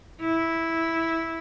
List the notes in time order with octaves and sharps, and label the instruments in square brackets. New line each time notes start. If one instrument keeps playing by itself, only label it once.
[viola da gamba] E4